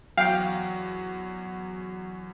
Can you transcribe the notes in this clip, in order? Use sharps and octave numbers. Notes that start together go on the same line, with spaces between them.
E2 F#3 F5 G5